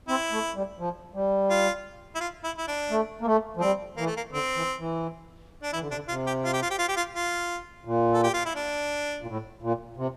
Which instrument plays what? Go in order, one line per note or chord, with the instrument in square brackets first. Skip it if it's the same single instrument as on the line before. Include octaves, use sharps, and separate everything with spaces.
[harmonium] C4 [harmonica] E4
[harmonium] A3
G3
F3
G3
[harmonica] F4
E4
F4
E4
E4
D4
[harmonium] A3
A#3
A3
F3
[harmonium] G3 [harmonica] C4
[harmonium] E3 [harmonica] A#3
[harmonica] A3
A#3
[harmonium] D3 [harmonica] C4
[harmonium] E3
E3
[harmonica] D4
[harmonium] E3 [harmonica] E4
[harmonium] D3
C3
[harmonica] D4
[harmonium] D3
[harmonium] C3 [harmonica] F4
[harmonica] G4
F4
G4
F4
G4
F4
G4
F4
F4
[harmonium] A#2
[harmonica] A4
G4
F4
E4
D4
[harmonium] A#2
A2
A#2
C3